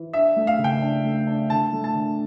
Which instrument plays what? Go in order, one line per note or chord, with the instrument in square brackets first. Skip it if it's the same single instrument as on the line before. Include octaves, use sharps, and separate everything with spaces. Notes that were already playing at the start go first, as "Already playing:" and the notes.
Already playing: [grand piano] E3
[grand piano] D4 [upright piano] E5
[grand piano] A3
[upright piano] F5
[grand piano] C#3
[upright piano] G5
[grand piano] D4
A3
D4
[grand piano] D3 [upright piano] A5
[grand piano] A3
[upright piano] A5
[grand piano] D3